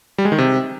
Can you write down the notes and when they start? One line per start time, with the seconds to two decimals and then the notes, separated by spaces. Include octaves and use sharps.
0.18 G3
0.25 G#3
0.32 D#3
0.38 C3